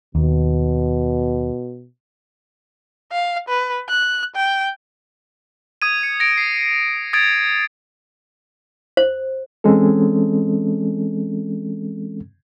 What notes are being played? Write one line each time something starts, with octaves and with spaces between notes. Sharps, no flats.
D#2 B2
F5
B4
F#6
G5
D#6 G#6 D#7
C#7
A#6 D7
C7
D#6 G#6 A6 D7
C5
E3 G#3 C4 C#4 A4